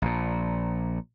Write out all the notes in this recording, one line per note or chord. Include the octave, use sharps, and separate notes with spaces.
A#1 A#2